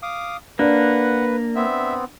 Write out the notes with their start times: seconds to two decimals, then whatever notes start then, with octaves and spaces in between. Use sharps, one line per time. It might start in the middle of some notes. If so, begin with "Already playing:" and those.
0.03 F5 D6 D#6
0.59 A#3 D4 B4 F#5
1.55 B3 C4 E5